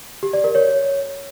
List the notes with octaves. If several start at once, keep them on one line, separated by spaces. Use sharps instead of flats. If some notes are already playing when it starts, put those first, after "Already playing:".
G4
D5
A#4
C#5